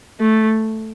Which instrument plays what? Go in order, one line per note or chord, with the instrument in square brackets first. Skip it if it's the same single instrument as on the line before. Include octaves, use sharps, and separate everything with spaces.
[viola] A3